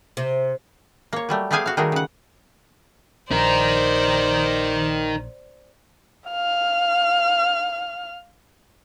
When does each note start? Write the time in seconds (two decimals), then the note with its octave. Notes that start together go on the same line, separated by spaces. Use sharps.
0.17 C3
1.13 A#3 C#5
1.29 F#3 G3 A3
1.51 A3 B3 G4 G#4 F5 G#5
1.66 F#4 F5
1.77 D#3 G3 A3 F#4 G#4 A#4
1.92 C#3 F#5
3.31 A#1 D#4 A#4 C5 D5
6.29 F5 F6